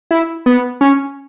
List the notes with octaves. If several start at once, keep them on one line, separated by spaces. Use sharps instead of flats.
E4
B3
C#4